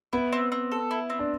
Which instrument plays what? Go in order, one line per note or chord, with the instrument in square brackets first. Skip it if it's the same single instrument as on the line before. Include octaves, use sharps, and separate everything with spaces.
[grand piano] B3 [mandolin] E4
[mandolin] C4
C4
A4
E4
C4
[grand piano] D4